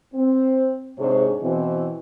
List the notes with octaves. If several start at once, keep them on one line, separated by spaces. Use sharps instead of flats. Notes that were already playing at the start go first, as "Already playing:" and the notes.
C4
G#2 C3 D4 G#4 C5 C#5
B2 E3 C4